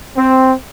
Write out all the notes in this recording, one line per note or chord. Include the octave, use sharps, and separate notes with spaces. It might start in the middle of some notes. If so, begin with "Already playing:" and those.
C4